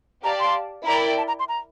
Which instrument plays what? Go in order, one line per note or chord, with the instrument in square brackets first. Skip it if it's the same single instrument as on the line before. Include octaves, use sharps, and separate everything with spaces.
[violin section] G4 D5 F5 A5 [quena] A#5
[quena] C6
[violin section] E4 A#4 D5 G5 [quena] A#5
[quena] A5
A#5
C6
A#5